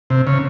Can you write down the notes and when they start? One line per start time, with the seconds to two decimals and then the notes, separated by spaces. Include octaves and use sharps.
0.10 C3
0.27 C#3